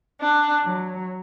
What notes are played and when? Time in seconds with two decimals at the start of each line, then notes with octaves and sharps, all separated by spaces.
0.19 D4
0.64 F#3